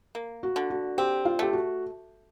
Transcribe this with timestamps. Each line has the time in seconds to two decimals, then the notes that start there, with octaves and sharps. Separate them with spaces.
0.15 A#3
0.43 F#4
0.56 D3
0.70 F#4
0.98 C4 G4
1.25 F4
1.39 A3 G4
1.53 F#4